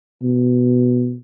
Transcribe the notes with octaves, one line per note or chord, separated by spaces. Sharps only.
B2